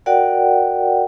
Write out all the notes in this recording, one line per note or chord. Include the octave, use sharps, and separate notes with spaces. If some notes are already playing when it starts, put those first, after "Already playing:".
F#4 A#4 D5 F#5 G5